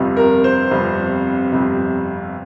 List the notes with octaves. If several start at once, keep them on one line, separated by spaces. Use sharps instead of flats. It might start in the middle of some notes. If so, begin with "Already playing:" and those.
Already playing: G1 F2 C3 G3
A#4
C5
G1 F2 C3 G3
G1 F2 C3 G3